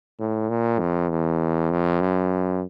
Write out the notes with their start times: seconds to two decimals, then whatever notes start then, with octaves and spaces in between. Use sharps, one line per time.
0.20 A2
0.50 A#2
0.79 F2
1.10 E2
1.71 F2
2.01 F#2